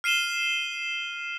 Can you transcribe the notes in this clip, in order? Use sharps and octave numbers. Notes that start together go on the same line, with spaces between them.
F6 C7 D#7 E7 G7